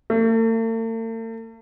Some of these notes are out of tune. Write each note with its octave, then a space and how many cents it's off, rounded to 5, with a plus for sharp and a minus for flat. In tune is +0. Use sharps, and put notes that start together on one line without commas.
A3 +45